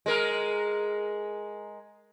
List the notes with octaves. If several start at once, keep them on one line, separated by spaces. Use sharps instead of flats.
G#3 A#4